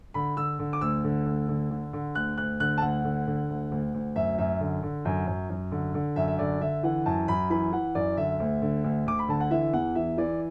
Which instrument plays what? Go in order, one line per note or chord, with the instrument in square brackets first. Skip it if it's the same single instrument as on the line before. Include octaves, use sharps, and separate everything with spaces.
[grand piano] D3 B5
D3 E6
D3
D6
D2 E6
D3
D2
D3
D3
D3
D2 F#6
D2 F#6
D3 F#6
A5
D2 F#5
D3
D3
D2
D2
D2
F#2 E5
F#2 E5
D3
D3
F#2
F#2
F#2
D3
D3
F#2 E5
E5
D3 D5
D3 E5
E3 F#5
F#2 A5
F#2 B5
E3 B5
E3 F#5
F#2 D5
D3 E5
D2
D3
D2
D2 D6
B5
D3 A5
F#5
E3 E5
E2 F#5
E3 E5
E3 D5